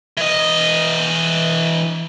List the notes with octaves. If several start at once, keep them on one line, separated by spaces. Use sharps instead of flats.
E3 D#5